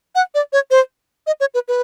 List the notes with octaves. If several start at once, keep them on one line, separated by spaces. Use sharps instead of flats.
F#5
D5
C#5
C5
D#5
C#5
B4
B4